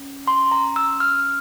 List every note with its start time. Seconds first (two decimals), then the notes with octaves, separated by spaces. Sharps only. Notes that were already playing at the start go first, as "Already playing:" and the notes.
Already playing: C#4
0.27 C6
0.52 A#5
0.76 E6
1.00 F6